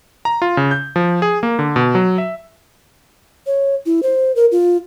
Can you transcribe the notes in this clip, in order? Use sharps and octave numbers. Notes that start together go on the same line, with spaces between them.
A#5
F4
C#3
G6
F3
G#4
A#3
D3
B2
F#3
E5
C#5
E4
C5
A#4
F4